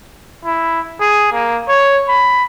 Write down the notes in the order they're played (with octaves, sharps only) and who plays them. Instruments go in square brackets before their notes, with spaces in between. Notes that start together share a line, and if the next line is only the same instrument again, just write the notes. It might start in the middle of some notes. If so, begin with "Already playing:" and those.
[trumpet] E4
G#4
A#3
C#5
B5